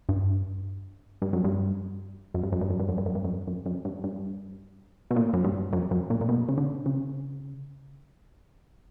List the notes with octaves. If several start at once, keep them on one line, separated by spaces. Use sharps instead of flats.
G2
G2
F#2
G2
F#2
G2
F#2
G2
F#2
G2
F#2
G2
F#2
G2
F#2
F#2
F#2
G2
G2
B2
A#2
F#2
G2
F#2
F#2
A#2
A#2
B2
C#3
D3
C#3